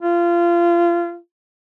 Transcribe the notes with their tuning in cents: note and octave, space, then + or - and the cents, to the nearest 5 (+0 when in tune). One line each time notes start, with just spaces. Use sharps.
F4 -25